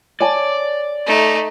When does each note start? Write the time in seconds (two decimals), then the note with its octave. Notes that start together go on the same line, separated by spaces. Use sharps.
0.20 C#5 D5 G#5 A5
1.06 A3 D#4